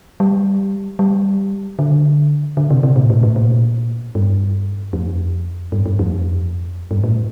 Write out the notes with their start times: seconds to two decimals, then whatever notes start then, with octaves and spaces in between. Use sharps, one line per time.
0.20 G3
0.99 G3
1.79 D3
2.57 D3
2.71 C3
2.83 C3
2.96 A#2
3.10 A2
3.23 A2
3.36 A#2
4.15 G2
4.93 F2
5.72 G2
5.86 G2
5.99 F2
6.91 G2
7.04 A2